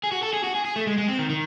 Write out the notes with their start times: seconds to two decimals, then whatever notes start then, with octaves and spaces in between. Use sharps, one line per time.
0.04 G#4
0.12 F#4
0.23 A4
0.33 G#4
0.43 F#4
0.55 G#4
0.65 G#4
0.76 A3
0.87 G#3
0.98 G#3
1.08 C4
1.19 D#3
1.30 D#3